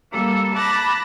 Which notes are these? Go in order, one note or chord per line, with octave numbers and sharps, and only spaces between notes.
G3 A#3 A4
A5 B5 D6 F#6 A6 A#6